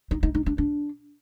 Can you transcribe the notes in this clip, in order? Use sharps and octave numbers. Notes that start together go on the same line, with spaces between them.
D#4
D#4
D#4
D4
D4